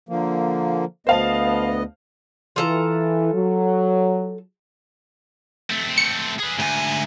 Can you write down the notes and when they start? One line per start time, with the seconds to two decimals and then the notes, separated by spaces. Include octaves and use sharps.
0.09 D3 F3 A#3
1.07 D2 B3 C5 D#5 F5 A5
2.56 E3 F4 A4 A#5
3.33 F#3
5.70 A3 C4
5.98 C#7
6.40 G#4 B4
6.59 D2 G#2 G#5